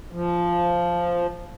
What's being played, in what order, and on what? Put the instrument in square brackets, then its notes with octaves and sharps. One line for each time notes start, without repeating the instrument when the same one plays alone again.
[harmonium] F3